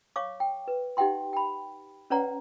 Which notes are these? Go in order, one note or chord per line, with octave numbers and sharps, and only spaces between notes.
C#5 F5 C#6 D6
G5
B4
D#4 G4 E5 F#5 G5 C6
G5 B5
C#4 B4 C#5 D5 F#5 A#5